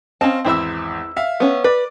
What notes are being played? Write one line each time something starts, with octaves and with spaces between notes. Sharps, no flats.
C4 C#4 D#5 F5 A5
G#1 E2 C4 E4 E5 E6
E5 F5
B3 C#4
B4 D5